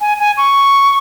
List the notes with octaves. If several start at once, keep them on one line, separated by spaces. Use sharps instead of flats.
G#5
G#5
C#6